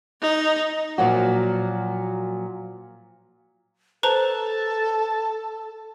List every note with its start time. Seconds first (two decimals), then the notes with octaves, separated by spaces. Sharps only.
0.22 D#4
0.98 A#2 F3 F#3 A#3 F#4
4.03 A4 B4 C5 A5 A#5